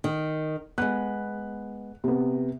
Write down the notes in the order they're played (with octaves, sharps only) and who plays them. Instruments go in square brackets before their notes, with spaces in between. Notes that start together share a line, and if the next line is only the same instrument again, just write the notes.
[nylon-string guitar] D#3
[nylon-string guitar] G#3 B3 [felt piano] F#6
[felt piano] C3 B3